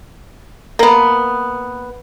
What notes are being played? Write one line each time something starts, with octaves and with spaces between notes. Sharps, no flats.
A#3 B3